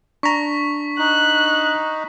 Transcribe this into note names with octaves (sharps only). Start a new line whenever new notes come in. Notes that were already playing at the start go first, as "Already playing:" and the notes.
D4 A#5 C#6 B6
D#4 F#6